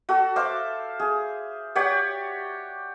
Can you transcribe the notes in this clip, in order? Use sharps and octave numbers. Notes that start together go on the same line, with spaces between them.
F#4 A4
C5 E5 F5 D6
G#4
G4 C#5 D5 F#5